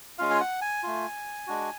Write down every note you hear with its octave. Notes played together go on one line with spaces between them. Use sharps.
G#3 C#4 F4 F5
G#5
F#5
G#5
A3 F4
G#3 D4 F#4